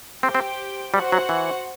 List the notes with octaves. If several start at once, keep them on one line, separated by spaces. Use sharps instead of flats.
C4 G4 C5 G5
C4
G3 F#4 C5 F#5
F#3
E3